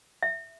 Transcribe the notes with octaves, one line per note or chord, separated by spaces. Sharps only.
E5